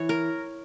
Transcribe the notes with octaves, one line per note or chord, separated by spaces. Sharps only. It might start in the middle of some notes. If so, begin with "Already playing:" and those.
Already playing: E3 C#5
A#4